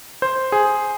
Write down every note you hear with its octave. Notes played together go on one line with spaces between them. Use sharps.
C5
G#4